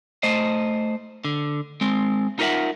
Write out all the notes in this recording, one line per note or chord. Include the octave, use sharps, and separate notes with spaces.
A3 C5 D#5
D3
G#3 C4
D#4 F4 A#4 B4 E5 F#5